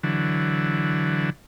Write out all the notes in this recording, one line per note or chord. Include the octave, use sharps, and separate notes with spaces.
D3 E3 F#3